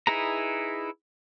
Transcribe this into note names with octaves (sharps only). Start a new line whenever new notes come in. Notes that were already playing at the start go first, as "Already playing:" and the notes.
D#4 E4 G#4 B4 A#5